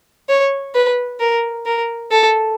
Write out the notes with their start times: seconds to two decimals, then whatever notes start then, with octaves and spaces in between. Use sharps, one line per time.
0.29 C#5
0.75 B4
1.20 A#4
1.66 A#4
2.11 A4